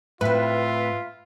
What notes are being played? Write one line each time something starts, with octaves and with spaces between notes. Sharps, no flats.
A2 C4 F4 B4 E5